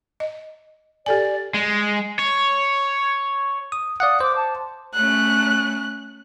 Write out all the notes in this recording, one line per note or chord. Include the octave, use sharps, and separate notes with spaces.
D#5
G4 A4 D5 G#5
G#3
C#5
D#6
D5 F5 F#5 D#6
C5 D6
A5
A3 C#4 F#6